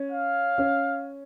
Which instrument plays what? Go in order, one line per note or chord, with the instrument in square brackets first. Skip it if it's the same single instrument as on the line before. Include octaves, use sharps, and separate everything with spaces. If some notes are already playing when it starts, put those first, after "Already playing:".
Already playing: [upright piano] C#4
[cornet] F5
[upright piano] C#4